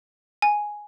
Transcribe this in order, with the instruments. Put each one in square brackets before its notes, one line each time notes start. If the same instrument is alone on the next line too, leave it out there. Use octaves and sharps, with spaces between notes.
[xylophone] G#5